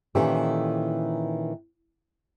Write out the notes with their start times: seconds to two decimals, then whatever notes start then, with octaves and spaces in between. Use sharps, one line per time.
0.15 A#2 D#3 E3 C#4 G4 A4